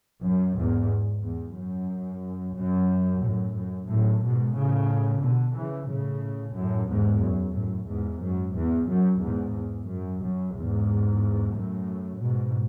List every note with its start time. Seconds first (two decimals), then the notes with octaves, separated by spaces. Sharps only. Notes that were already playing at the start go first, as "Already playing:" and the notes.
0.23 F#2
0.57 E2 G#2
1.23 E2
1.56 F#2
2.56 F#2
3.22 F#2 A2
3.56 F#2
3.89 F#2 A2
4.22 G#2 B2
4.56 A2 C#3
5.22 B2 D3
5.55 C#3 E3
5.89 A2 C#3
6.55 F#2 A2
6.89 E2 G#2
7.22 F#2
7.55 F#2 A2
7.88 E2 G#2
8.21 F#2
8.55 E2
8.89 F#2
9.21 E2 G#2
9.55 E2
9.88 F#2
10.21 F#2
10.55 E2 G#2
11.54 F#2 A2
12.21 G#2 B2